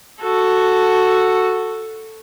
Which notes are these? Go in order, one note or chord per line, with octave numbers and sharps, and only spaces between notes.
F#4 A4